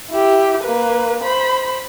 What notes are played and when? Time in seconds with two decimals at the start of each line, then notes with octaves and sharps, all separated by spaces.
0.11 E4 G4
0.63 A#3 B4
1.23 C5 B5